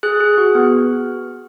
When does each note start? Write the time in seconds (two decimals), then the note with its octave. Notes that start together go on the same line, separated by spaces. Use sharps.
0.03 G#4 F#6
0.20 G#4
0.38 F#4
0.55 B3